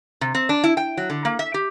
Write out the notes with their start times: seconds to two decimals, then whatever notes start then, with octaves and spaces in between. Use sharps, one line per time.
0.21 C3
0.35 C4
0.49 D4
0.64 E4
0.77 G5
0.97 F#3
1.10 D3
1.25 A#3
1.39 E5
1.54 G4